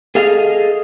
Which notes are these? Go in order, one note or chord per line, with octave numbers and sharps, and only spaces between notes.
G#4 A4 D#5 F5